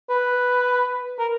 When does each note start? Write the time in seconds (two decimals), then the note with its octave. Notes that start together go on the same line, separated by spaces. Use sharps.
0.10 B4
1.19 A#4